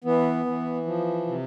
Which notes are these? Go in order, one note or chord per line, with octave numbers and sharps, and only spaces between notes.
E3 B3
E3
F3
C3